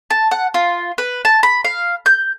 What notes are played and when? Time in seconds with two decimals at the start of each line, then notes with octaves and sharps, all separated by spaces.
0.11 A5
0.31 F#5
0.54 F4
0.98 B4
1.25 A5
1.43 B5
1.65 F5
2.06 G6